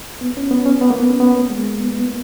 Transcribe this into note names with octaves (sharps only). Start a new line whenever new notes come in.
B3
C#4
B3
C#4
B3
A#3
B3
C#4
B3
B3
G#3
A#3
B3
B3
A#3